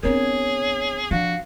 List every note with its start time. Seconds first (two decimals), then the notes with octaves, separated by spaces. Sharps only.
0.03 B3 C4 D4 G#4 A#4 C#5
1.11 F3 D4 F#4 F5